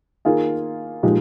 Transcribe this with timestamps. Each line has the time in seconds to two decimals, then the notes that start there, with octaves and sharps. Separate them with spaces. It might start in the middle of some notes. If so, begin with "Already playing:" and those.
0.25 D#3 A#3 F4 G#4
1.03 A#2 F3 G#3 D#4 G4